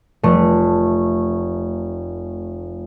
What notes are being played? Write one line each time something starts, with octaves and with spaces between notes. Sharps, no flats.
F1 A3